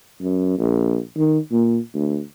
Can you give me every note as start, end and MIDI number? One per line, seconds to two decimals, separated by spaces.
0.21 0.54 42
0.58 0.98 34
1.17 1.38 51
1.52 1.78 46
1.94 2.20 38